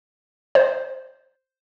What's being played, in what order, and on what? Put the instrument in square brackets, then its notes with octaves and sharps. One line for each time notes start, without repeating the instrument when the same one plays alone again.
[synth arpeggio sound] C5